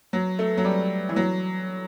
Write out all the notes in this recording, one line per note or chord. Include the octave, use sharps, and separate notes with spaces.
F#3
A3
F#3
G3
E3
F#3